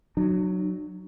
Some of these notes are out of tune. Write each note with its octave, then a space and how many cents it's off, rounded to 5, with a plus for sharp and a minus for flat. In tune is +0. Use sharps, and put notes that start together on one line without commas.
F#3 +0 D4 +45